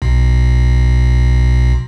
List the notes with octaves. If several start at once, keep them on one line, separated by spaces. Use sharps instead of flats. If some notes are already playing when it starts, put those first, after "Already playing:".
B1 B2